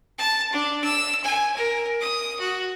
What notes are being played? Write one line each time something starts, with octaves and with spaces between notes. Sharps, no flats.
A5
D4
E6
G#5
A#4
D#6
F#4